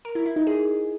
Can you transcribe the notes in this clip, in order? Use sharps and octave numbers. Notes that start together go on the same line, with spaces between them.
A#4
E4
E4
D#4
G#4